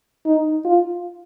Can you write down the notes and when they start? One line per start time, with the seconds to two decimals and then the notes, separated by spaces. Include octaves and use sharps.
0.26 D#4
0.65 F4